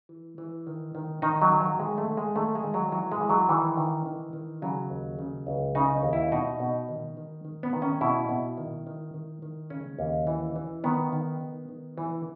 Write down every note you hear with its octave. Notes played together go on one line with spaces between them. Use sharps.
E3
E3
D#3
D#3
D#3 D#4
F#3
D#3
F#3
D#3 G#3
A3
D#3
G#3
D#3 A3
G#3
D#3
F#3
E3 F#3
G#3
E3
F#3
D#3 E3
D#3
D#3
D#3
C#3 F#3
D#2
C#3
C#2
C#3 D#4
D#2
E4
B2 D#4
B2
D#3
D#3
D#3
B3
D#3
C#4
B2 E4
B2
D#3
D#3
D#3
D#3
C#3 C#4
D#2
E3
E3
D#3 B3
D#3
D#3
D#3
E3